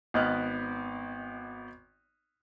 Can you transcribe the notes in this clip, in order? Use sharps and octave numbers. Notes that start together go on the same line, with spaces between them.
G#1 B3 D#5 F6 F#6